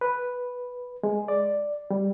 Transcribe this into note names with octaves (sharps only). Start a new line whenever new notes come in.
B4
G#3
D5
G3